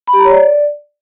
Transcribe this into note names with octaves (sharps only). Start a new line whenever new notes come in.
B5
G4
A#5
C#5
D5